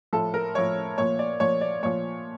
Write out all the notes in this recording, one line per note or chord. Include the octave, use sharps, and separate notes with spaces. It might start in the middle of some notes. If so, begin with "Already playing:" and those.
A2 F3 A4
A#4
A2 F3 C#5
A#2 F3 C#5
D5
A#2 F3 C#5
D5
A#2 F3 C#5